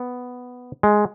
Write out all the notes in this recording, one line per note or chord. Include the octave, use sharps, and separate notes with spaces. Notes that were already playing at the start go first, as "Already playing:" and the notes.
Already playing: B3
G#3